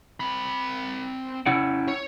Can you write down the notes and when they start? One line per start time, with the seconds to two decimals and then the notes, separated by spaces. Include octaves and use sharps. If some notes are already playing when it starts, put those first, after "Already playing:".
0.20 C4 B5
1.46 C#4 E4 F#5
1.88 C#5